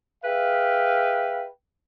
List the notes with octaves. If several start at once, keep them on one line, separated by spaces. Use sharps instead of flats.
G#4 B4 E5 F5 G5